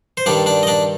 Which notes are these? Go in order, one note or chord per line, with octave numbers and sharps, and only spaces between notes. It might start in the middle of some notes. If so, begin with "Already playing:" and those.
C5
G2 D#3 G3 D4 D5
D4 D5
D#5
D4 D5